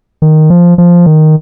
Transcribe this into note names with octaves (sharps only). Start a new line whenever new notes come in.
D#3
F3
F3
D#3